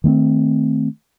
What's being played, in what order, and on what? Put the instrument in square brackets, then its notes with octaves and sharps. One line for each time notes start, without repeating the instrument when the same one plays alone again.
[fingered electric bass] D#3 A3 B3 C4